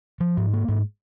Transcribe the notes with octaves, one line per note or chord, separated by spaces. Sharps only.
F3
G#2
A#3
G#2